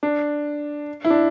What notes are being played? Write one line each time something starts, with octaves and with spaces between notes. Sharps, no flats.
D4
E4
D4